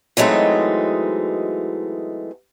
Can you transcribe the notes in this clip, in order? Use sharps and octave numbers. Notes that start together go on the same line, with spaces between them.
E3 F#3 G#3 A3 C4 D#4